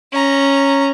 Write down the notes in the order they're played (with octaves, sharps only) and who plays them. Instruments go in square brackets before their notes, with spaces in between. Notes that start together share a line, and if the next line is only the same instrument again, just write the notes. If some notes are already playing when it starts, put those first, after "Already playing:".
[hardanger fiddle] C#4 A#5